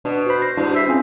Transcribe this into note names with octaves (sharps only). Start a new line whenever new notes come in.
B2 D4
F#4 C5 B5
A#6 C7
G2 D4 E4 F#4 D5
E5 E6 C7
C4 C#4 F4 G#4